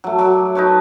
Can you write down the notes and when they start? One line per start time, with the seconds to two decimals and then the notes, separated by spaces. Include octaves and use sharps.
0.04 F#3 A3
0.18 F#3 D6
0.55 D#4 A4 B4 C#5